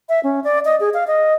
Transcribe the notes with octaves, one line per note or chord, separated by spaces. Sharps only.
E5
C#4
D5
D#5
G#4
F5
D#5